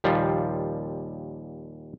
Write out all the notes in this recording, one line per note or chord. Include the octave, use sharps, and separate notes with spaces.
D#2 A#2 F3 G3